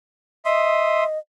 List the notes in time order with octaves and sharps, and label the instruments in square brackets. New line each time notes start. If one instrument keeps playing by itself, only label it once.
[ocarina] D#5 [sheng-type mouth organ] E5 C6 D#6